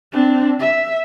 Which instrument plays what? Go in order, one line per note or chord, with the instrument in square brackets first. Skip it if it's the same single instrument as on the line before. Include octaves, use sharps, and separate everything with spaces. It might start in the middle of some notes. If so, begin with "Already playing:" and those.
[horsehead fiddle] C4 D4
E5